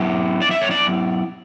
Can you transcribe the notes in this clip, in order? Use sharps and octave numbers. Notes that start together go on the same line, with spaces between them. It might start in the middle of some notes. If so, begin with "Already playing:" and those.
Already playing: F#3 B3 E4
D5
E5
C#5
D5